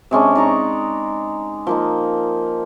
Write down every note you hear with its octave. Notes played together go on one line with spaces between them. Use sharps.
C3 G#3 C#4 D4
D#4 D5 A#5 C#6
F3 A#3 D#4